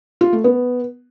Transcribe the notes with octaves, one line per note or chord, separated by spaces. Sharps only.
F4
A3
B3